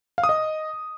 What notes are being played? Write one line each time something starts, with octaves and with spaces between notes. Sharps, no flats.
F5
D#6
D#5